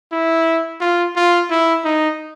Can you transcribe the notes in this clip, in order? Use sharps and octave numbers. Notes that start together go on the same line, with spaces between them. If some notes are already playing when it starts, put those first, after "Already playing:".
E4
F4
F4
E4
D#4